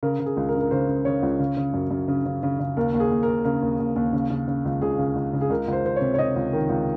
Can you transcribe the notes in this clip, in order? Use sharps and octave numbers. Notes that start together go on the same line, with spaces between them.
C#3 A#4
C#3
G#4
C#2
A#4
C#3
A#4
C#3 C5
C#3
C#3 C#5
C#2
C#3
C#3
F#2
F#2
C#3
C#3
C#3
C#3
D#2 A#4
D#2
G#4
D#2
D#2 A#4
C#3 A#4
D#2
D#2
D#2
C#3
C#3
C#3
C#2
C#2 G#4
C#3
C#2
C#3
G#4
C#2 A#4
C#2 C5
C#2 C5
C3 C#5
C#5
C3 D#5
C#2
D#3
C#2